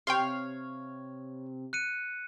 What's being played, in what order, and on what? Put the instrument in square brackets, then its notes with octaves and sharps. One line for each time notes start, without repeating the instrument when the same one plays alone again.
[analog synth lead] C3 [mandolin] C#5 F5 [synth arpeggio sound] G5 C6
[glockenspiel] F#6 C#7 D#7